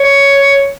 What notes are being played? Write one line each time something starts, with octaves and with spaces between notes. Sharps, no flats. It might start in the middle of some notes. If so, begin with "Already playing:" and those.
Already playing: C#5